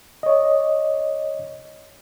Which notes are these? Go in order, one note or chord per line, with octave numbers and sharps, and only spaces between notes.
C#5 D#5